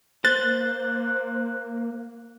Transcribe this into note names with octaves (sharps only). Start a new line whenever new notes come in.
A#3 C5 F#6 A6